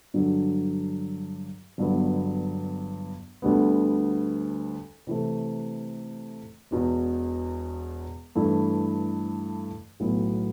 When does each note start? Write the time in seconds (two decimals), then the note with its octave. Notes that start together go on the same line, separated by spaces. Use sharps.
0.14 G2 D3 F#3
1.78 G1 G2 F#3 B3
3.42 D2 D3 G3 B3
5.07 C3 E3 A3
6.71 E1 E2 B2
8.35 G2 E3 A3 E4
10.00 B1 A2 F#3 B3 E4